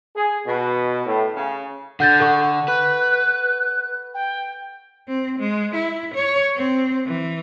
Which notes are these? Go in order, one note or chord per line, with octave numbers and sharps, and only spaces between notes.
G#4
B2
A2
C#3
D3 F#5 G6 A6
A4 F#5 C#6
B4 F#6
G5
C4
G#3
E4
C#5
C4
E3